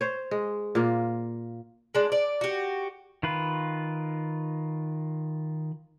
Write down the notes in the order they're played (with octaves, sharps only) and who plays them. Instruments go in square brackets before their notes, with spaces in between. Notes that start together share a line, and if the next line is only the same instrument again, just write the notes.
[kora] C5 C#5
G#3
A#2 A#3 F4
[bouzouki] G#3 D4
D5
F#4 G4
[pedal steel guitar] D#3 F4 B4